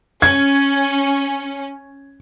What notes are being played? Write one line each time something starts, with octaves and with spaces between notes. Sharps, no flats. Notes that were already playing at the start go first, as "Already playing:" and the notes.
C#4 G#6